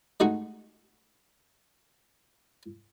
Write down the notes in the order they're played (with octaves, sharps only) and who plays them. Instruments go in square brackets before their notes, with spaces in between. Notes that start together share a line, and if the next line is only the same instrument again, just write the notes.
[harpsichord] G#3 A3 D#4 F#4 G#4